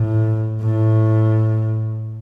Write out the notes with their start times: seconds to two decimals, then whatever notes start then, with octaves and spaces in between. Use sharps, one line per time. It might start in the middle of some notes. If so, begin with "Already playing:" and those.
Already playing: A2
0.61 A2